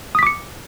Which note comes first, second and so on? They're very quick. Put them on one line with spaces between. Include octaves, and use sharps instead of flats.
D#6 B6 D6 C#7